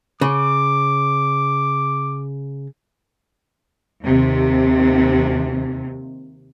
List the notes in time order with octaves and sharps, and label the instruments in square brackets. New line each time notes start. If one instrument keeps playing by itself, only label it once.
[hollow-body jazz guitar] C#3 [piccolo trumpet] D6
[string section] D#2 C3